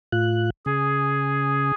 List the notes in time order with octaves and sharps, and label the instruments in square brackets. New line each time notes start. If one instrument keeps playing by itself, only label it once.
[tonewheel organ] A2 F4 F#6
[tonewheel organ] C#3 [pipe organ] G#4